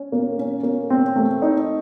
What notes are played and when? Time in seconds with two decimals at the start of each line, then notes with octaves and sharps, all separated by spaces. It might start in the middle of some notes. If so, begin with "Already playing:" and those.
Already playing: C#4
0.12 A#3
0.39 C#4
0.63 A#3
0.90 C4
1.16 A3
1.42 D#4